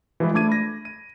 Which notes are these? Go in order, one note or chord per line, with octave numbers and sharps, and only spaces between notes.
E3 F3 G3 G#3 E4 B4
A3 D4 D6 G#6 D#7
B5 A#6
D#7